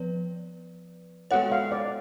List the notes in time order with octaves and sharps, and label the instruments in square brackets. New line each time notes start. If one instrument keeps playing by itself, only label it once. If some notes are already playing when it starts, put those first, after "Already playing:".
Already playing: [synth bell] F3 B3 B4 D5
[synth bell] G#3 B3 F#4 A4 C#5 [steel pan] F#5
[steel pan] F5
D5